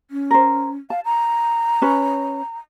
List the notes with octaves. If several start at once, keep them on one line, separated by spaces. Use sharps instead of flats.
C#4
A#4 C5
F5 A5
A#5
C#4 B4 C#5